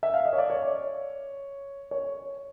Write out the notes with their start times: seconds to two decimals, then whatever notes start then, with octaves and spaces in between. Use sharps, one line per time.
0.03 E5
0.14 F5
0.25 D#5
0.33 C#5
0.38 D5
0.50 C#5
1.91 C#5